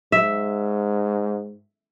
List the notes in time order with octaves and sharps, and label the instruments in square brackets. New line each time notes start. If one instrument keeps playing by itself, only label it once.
[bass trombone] G#2 [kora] E5